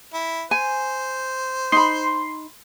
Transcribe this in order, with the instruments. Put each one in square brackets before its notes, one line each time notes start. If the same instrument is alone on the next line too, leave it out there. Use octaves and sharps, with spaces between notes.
[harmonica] E4
[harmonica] C5 [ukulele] G#5
[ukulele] D#4 B5 [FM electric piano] C6